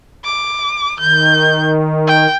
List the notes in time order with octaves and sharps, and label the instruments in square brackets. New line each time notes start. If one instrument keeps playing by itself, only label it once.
[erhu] D6
[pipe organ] D#3 [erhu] G6
[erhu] G5